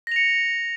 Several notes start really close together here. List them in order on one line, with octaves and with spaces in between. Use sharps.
A#6 F7 C#7